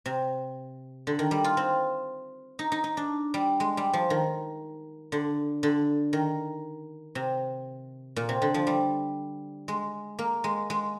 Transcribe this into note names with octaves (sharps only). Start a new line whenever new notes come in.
C3
D3
D#3
G3
F4
C4
D#4
D#4
D#4
D4
G3
G#3
G3
F3
D#3
D3
D3
D#3
C3
A#2
C3
D3
F3
G3
G#3
A#3
G#3
G#3